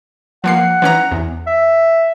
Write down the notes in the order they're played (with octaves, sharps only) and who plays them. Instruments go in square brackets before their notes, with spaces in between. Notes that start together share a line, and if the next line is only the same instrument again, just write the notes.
[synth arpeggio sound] F3 A#3 C7 [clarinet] F#5
[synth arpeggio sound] E3 C#4 A#5
E2
[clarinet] E5